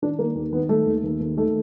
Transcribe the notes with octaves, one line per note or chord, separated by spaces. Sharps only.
D#3 D4
D#3 A#3
D#2
D#3 B3
D#3 A3
D#2
D#2
D#2
D#3 A3